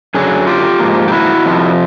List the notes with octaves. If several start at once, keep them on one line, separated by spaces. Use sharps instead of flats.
F#2 D3 F#3 G#4
F4 G4
G#2 F3 A#3
G4
E4 F#4
F2 C3 F3